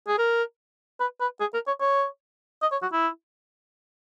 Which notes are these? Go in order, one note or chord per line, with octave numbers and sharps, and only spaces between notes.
G#4
A#4
B4
B4
G#4
A#4
C#5
C#5
D#5
C#5
F#4
E4